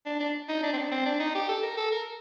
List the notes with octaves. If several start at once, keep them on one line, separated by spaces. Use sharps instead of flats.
D4
D4
D#4
D4
C4
D4
C4
D4
D#4
G4
A4
A#4
A4
A#4